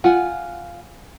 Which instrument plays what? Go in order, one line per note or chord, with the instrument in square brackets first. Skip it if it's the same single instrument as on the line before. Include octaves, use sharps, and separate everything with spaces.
[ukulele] F4 [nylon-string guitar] F#5 G#5